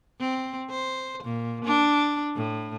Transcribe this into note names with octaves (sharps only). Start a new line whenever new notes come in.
C4
C5
A#2
D4
A2